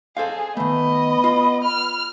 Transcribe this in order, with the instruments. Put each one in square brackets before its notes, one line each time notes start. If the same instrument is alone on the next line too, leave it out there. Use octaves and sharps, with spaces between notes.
[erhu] G#4 [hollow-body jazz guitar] A4 C5 F5
[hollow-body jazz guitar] D#3 A3 [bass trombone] B3 [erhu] D#5 [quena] B5
[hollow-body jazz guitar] F4
[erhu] F6